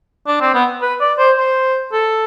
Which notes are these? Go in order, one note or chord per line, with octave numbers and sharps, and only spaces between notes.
D4
C4
B3
B4
D5
C5
C5
A4